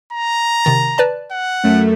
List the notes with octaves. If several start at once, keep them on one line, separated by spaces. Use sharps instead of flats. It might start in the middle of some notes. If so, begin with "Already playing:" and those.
A#5
C3 D#3 A6
B4 D5 A5
F#5
F#2 A3